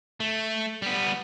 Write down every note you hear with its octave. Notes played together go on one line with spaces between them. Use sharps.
A3
G3 B3